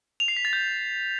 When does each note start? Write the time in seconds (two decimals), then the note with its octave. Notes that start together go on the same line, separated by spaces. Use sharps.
0.20 F7
0.28 C7
0.36 B6
0.45 A6
0.53 G6